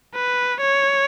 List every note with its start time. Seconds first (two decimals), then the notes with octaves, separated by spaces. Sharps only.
0.14 B4
0.61 C#5